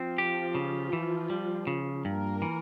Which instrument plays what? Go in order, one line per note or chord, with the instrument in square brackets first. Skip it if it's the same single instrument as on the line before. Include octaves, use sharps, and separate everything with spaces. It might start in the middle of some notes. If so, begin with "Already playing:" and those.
Already playing: [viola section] F3 F4 [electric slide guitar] C4
[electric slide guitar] G4
C#3
E3
G3
C#3
[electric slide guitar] G2 [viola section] A#3 A#4
[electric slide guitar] E3